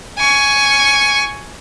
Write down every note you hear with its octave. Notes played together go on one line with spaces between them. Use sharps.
G#5 C#6